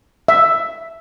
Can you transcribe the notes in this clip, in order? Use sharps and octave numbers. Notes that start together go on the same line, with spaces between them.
E5